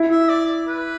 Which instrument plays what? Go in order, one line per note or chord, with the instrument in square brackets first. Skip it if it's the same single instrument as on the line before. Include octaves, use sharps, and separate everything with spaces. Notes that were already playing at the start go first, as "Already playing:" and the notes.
Already playing: [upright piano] E4
[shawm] E5
D5
B4